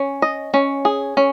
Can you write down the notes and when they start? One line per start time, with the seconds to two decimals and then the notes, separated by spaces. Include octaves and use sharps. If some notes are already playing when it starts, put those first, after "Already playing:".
Already playing: C#4
0.22 D#5
0.54 C#4
0.85 G#4
1.17 C#4